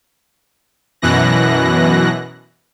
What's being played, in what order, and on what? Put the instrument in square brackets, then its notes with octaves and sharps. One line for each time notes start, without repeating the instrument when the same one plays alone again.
[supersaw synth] F#2 B2 E3 F#6 A#6